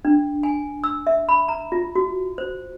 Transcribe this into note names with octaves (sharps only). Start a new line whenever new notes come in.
D4
G#5
E6
E5
B5
A#5
F4
F#4
C5